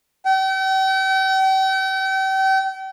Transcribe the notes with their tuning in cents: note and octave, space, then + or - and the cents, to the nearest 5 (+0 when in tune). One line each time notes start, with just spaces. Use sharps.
G5 -40